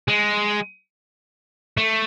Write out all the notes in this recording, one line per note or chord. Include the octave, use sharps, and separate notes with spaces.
G#3
A3